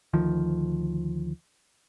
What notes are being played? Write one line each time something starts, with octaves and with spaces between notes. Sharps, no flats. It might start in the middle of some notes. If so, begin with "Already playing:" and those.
D2 D#3 F3